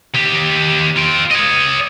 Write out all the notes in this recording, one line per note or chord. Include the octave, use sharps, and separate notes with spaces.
D#2 G4
F4 G5
C#5 D#5